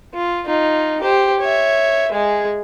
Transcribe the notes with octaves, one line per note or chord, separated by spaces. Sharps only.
F4
D#4 F4
G4 C5
C#5 E5
G#3 G#4